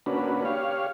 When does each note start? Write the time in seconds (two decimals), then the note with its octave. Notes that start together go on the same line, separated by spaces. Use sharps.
0.06 A#3 C#4 D4 F#4 B4
0.45 G4 C#5 F5